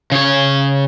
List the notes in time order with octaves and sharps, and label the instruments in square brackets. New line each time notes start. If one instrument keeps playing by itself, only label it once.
[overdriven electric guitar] C#3 C#5